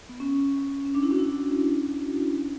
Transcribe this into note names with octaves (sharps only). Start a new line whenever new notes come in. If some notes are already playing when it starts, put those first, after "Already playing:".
B3
C#4
C#4
D4
E4
D4 F#4
E4